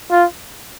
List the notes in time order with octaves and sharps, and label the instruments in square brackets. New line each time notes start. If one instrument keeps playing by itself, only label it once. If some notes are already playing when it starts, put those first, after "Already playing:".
[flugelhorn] F4